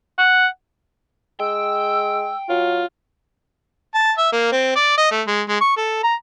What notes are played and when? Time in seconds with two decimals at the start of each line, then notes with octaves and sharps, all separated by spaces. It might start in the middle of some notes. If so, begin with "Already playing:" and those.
0.18 F#5
1.40 G#3 G5 E6
2.49 F#3 F4
3.95 A5
4.18 E5
4.32 A#3
4.52 C4
4.76 D5
4.97 D#5
5.11 A3
5.27 G#3
5.49 G#3
5.61 C#6
5.77 A4
6.04 A#5